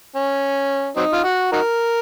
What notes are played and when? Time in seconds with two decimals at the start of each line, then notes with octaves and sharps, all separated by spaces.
0.16 C#4
0.96 F#3 C4 D#4
1.13 F4
1.24 F#4
1.52 D#4 F#4 A#4